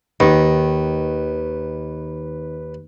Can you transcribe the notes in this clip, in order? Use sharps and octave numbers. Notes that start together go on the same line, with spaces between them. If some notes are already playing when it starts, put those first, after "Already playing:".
D#2 D#3 B4